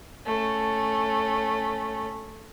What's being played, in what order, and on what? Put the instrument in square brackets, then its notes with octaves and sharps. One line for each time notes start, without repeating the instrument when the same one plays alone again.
[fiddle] A3 C#4